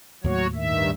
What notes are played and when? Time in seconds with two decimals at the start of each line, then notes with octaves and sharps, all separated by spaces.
0.24 D#2 A2 F#3 A#3 F#4 C#5
0.55 G2 D#3 E5